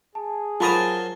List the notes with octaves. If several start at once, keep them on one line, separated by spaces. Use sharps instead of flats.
G#4 A5
F#3 F4 A#4 C5 A5 B5 D#6 A6